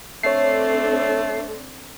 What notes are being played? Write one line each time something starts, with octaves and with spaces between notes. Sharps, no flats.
A3 C4 D4 A4 C#5 C7